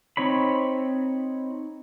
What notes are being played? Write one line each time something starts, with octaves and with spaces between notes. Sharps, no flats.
C4 D#4 C#5 B5